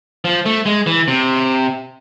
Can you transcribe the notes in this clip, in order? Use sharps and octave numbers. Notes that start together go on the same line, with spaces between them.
F3
A3
G#3
E3
C3